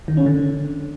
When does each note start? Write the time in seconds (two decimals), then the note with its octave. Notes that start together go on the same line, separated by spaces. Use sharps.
0.08 D#3
0.17 C#4
0.26 D3